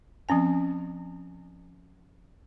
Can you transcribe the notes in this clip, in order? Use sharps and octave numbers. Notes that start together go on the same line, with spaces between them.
F3 C4 C#4 G#5